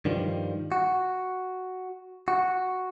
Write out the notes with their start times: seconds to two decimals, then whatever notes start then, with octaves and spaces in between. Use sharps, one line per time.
0.05 G2 D#3 F3 G3
0.72 F#4
2.28 F#4